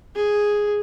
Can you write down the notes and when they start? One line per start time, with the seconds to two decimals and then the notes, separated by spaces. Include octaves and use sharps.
0.15 G#4